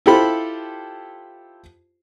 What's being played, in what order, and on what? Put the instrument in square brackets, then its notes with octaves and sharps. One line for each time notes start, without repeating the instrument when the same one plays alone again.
[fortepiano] E4 F4 G4 A4 C5 B5